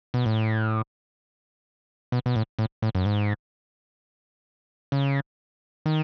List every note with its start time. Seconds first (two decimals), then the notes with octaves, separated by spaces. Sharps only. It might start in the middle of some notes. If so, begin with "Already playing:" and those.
0.14 B2
0.26 A2
2.12 B2
2.26 B2
2.36 A2
2.59 A2
2.82 A2
2.95 F#2
3.06 G#2
4.92 C#3
5.86 D#3